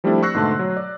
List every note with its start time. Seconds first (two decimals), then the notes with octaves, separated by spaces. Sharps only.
0.04 F3 G3 A3 C4 D4 E4
0.23 C#6 E6 F#6 A#6 C7
0.35 G#2 B2 D3 A3 A5 C6
0.59 F#3
0.77 D5